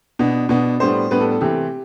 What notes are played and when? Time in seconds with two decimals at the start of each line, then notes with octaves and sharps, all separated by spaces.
0.19 B2 B3 D4
0.49 B2 B3 D4
0.80 A2 G3 B3 D4 C5
1.11 A2 G3 B3 D4 B4
1.20 A4
1.31 A4
1.41 C3 E3 A3 C4 G4